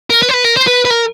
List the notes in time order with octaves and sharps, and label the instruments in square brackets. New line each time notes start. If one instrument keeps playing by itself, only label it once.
[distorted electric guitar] A#4
B4
C5
B4
A#4
C5
B4
B4
A#4